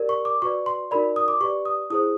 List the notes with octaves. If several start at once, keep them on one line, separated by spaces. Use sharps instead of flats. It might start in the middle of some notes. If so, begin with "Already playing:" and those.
Already playing: G4 A#4 D5
C#6
D6
F#4 B4 D5 C#6
C6
D#4 F#4 A#4 D5 B5
D#6
D6
G4 B4 D5 C#6
D#6
E4 G#4 C5 D#6